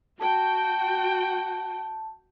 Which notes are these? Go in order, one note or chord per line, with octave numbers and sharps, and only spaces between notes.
F#4 G5 A5